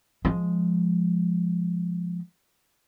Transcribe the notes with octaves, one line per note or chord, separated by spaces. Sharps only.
F3 G#3